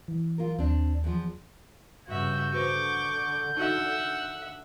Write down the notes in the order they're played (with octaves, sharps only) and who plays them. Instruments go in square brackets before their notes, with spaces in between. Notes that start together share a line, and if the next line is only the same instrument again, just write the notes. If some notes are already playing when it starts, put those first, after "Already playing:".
[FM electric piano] E3
[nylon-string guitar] F4 A#4
[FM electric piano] D#2 [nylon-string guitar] C4 D4
[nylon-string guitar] E2 F3
[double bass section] G2 C#3 [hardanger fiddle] F#4 E5 [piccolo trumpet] G6
[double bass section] D3 [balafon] F#4 B4 C5 [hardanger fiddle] C#6 D6
[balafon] D#4 F#4 [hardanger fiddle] E5 F#5